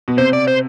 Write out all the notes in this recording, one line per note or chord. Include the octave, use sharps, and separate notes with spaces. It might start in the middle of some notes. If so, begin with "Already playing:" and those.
B2
C3 C5
D5
C5